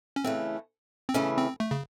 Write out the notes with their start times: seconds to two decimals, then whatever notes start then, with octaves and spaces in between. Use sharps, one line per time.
0.16 C#4
0.24 C#3 E3 A3 C4
1.09 C4
1.14 C#3 E3 A3 C#4
1.38 C4
1.60 A3
1.71 C#3